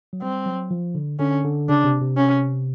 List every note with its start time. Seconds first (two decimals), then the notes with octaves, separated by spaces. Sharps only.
0.13 F#3
0.22 G3 C4
0.46 F#3
0.71 F3
0.95 D3
1.19 D3 C#4
1.45 D3
1.69 C#3 D4
1.84 C3
2.01 C3
2.17 C#4